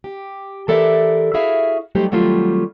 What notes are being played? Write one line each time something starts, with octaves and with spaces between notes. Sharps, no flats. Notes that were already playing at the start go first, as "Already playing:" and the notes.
G4
E3 G4 A4 A#4 D5 E5
E4 F#4 G#4 E5 F5
F#3 G3 A3 D#4 G4 C5
D#3 F#3 G3 A3 C4 F4